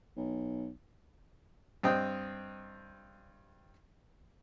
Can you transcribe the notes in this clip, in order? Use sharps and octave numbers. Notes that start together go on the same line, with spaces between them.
B1
G2 C4 D#5 G5